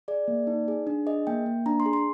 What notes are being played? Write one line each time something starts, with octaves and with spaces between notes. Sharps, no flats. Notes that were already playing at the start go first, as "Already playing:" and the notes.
G#4 D5
A#3
D#4
G#4
D4
G#4 D#5
A#3 G5
A#3
D4 A#5
C6
G#4
C6